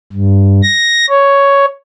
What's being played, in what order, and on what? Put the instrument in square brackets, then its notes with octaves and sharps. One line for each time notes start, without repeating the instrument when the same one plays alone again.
[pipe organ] G2
A#6
C#5